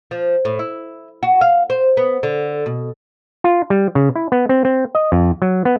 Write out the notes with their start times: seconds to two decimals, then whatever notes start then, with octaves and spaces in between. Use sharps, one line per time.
0.11 F3
0.45 A2
0.59 E4
1.23 F#4
1.41 F5
1.70 C5
1.97 B3
2.23 D3
2.66 B2
3.44 F4
3.70 G3
3.95 C#3
4.16 E4
4.32 B3
4.49 C4
4.65 C4
4.95 D#5
5.12 F2
5.42 F#3
5.65 B3